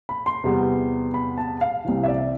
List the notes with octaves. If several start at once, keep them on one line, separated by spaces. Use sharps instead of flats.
B5
C6
E2 C3 G3 B3
B5
A5
F5
C2 C3 E3
E5
D5